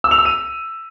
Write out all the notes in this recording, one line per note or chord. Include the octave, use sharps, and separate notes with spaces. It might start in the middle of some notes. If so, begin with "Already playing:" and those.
E6
F7
E6
D#7